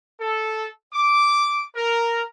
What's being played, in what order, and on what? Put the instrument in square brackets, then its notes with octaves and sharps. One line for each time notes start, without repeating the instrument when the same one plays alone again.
[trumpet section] A4
D6
A#4